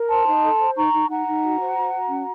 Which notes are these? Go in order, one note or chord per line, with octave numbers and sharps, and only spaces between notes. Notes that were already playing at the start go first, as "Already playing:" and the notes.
Already playing: A#4
C5 A5 C6
D#4
A4
C5
D#4 A#5 C#6
D#4
D#4 F#5 A#5
D#4
F#4
C5
F#4
F#4
C#4